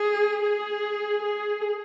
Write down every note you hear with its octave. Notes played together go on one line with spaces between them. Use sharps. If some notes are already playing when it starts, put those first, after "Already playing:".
Already playing: G#4
G#4
G#4